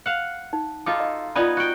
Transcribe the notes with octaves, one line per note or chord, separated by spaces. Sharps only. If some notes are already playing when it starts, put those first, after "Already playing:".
F5 F#5
D#4
D#4 F4 F#4 A4 D6
D#5
B3 D#4 F4 D5 G#5 B5
F#4 G5